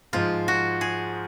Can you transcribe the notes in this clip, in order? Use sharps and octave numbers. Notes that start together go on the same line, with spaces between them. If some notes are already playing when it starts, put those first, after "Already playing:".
G#2 F3 G#3 F4
F#4
G#4